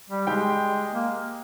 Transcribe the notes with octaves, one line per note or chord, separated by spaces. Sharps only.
G3
G#3 G4 G5
A#3